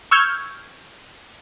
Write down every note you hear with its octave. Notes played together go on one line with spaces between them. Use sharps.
C#6 E6 F6 G6 G#6